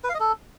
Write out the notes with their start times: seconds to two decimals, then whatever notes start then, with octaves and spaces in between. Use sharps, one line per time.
0.04 B4
0.09 F5
0.15 D#5
0.20 A4